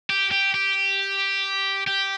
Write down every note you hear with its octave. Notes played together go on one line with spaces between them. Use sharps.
G4
G4
G4
G4